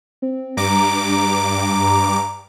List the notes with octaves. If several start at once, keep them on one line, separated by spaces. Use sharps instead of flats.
C4
G2 A#5 D6